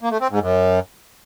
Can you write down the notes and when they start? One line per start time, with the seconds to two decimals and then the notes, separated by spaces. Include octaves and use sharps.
0.01 A#3
0.11 A3
0.21 C4
0.30 G#2
0.40 F#2